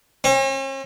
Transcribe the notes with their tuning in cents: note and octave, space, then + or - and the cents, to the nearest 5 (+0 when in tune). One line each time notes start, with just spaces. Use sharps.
C#4 -45